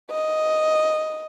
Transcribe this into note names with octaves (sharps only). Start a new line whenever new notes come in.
D#5